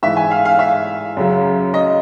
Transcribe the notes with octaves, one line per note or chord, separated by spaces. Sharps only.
G#2 E3 E5
G#5
F5
F5
E5
F#2 C#3 F#3
D#5